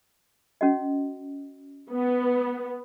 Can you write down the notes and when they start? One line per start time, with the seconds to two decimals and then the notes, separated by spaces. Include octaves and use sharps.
0.61 C#4 F#4 D#5
1.90 B3